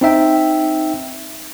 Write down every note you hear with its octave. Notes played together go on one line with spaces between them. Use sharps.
C4 D#4 E5 G5